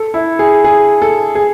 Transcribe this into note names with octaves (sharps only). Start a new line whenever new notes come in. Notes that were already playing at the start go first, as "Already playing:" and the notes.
Already playing: A4
E4
G#4
G#4
A4
G#4